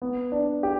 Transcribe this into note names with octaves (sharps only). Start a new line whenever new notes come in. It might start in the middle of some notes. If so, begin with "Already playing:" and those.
B3
D4
G4